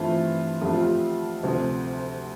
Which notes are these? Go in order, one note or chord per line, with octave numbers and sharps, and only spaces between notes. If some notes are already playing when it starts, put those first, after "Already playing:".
Already playing: G2 E3 A3 C4 F4
F2 D3 F3 A3 G4
F4
G4
D2 C3 F3 C4